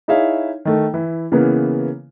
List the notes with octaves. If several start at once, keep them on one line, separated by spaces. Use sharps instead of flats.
D#4 E4 G#4 C#5 E5 F5
D#3 A3
E3 E4
C#3 E3 A#3 B3